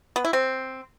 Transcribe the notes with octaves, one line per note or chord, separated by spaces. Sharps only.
B3
E4
C4